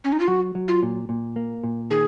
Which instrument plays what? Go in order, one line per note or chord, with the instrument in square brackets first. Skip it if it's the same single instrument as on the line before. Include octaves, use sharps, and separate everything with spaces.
[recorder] C#4
D#4
F4
[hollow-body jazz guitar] F#3 [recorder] F#4
[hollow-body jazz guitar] F#3
[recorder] F4
[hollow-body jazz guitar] A#2
A#2
A#3
A#2
[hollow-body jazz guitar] D#3 [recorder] G#4